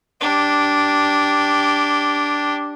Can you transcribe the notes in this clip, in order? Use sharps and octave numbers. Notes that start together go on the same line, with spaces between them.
D4 G4